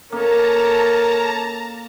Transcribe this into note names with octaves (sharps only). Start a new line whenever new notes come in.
A#3 C#4 A4 A#4 A5 A#5